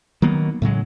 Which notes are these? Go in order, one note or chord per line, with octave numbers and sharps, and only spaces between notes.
D#3 F#3 A#3 B3
A2 C#3 F#3 G#3